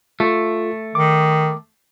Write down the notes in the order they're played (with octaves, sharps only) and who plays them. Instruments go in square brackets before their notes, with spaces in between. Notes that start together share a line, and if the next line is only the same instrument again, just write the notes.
[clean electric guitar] A3 [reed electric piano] F4 A4
[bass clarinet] D#3 [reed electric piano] D6